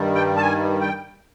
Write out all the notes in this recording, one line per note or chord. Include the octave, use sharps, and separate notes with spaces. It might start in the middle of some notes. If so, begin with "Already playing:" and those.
Already playing: G2 D#3 G3
G5
A5
G#5
G5